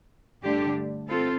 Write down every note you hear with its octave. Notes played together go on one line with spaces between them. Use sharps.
G2 D3 A3 D4 G4
C4 F4 A4